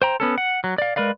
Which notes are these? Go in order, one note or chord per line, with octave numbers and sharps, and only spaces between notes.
C5 G5 A#5
B3 C#4 A4
F#5
F#3
D5 F5
G#3 A#4 B4 D5 F5